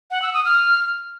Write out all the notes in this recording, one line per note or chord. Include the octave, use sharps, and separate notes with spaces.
F#5
E6
D#6
F6